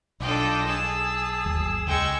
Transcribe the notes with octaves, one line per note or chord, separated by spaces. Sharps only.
B1 D4 F4 A4 D#5 G5
G#4 A5 E6
G1 D#2 F#3
C#2 G#3 G5 G#5 C#6 E6